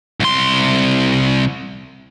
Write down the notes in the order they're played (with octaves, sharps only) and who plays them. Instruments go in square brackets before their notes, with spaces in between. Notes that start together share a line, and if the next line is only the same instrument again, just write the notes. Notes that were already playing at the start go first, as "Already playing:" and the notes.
[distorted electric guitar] C2 C6